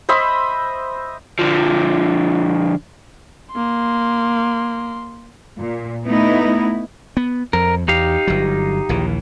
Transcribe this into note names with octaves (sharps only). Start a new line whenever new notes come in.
C5 D#5 E5 B5
D3 F3
A#3 C6
A#2
A3 B3 D#4 E4
B3
F2 A#4
E2 D#4 G4 F5
G1 F#3
A#1 D#2 E3